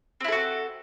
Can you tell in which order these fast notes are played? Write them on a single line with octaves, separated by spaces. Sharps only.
C4 E4 A4 F#4